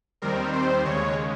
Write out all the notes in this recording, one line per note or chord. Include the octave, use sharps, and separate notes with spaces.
D#2 D#3 G3 C4 A#4
C5
D#2 C#3 G#3 C#5